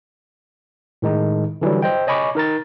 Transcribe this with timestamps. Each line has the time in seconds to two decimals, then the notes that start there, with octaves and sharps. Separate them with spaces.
1.02 A2 D#3 G#3 D#4
1.61 D3 E3 F#3 G3
1.82 C5 D#5 G5
2.07 C#5 D#5 G#5 B5 C#6 D6
2.35 D#4 A#4 A#5 A6